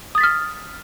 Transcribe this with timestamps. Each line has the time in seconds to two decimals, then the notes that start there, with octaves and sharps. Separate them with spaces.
0.15 D#6
0.18 A6
0.21 B6
0.23 F6